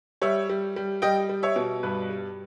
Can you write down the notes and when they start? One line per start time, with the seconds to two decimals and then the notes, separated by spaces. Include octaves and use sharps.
0.22 G3 C#5 E5
0.49 G3
0.76 G3
1.02 G3 D#5 G5
1.29 G3
1.43 C#5 E5
1.56 B2
1.83 G2 B4
2.10 G3